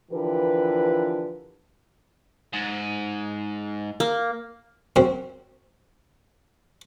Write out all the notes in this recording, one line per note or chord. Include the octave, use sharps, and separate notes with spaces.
D3 E3 F3 G4 A#4 B4
G#2
A#3
F#2 C4